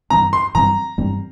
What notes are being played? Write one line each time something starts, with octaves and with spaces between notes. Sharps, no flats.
G2 E3 G3 C4 A#5
C6
G2 E3 G3 C4 A#5
G2 E3 G3 C4